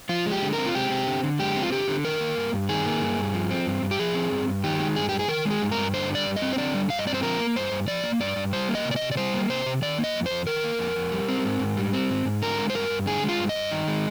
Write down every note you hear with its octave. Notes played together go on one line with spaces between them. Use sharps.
F3 F4
G#3
G4
D3
A#4
C4
F4
G#3 G4
C4
D3
D3
G#3 G4
C4
F4
D3 G4
D3
D#3 A#4
A#3
G2
G2
D#3 G#4
A#3
G2
G2
F3
C4
G2
G2
G4
F3 G#4
C4
G2
G2
D#3 G4
G#3
G2 G#4
G2 G4
G#4
D#3 A#4
G#3
G#4
G2
A#4
G2
D3 C5
G3
D5
G2
D#5
C4
C5
D3 D5
G3
G2 F5
D#5
C4 D5
C5
F3 A#4
A#3
G2 C5
G2
F3 D5
A#3
G2 D5
G2
G3 C5
A#3
D#5
C3
D5
D#5
C3
D5
G3 C5
A#3
C3 C5
C3
D#3 D5
A#3
D#5
F2
F2 C5
D#3 A#4
A#3
F2
F2
G3
C4
G#2
G#2
G3
C4
G#2
G#2
D3 A#4
G#3
C5
G2 A#4
G2
D3 G#4
G#3
F4
G2
D#5
G2
D#3
G#3